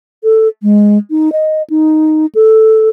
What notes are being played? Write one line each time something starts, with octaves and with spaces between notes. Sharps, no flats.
A4
G#3
D#4
D#5
D#4
A4